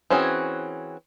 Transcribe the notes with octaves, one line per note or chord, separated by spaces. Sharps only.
E3 C4 C#4 F#4 G#4